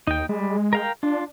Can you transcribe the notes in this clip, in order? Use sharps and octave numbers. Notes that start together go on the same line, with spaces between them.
D#2 D#4 G5
G3 G#3
A#4 F5 G5
D4 F4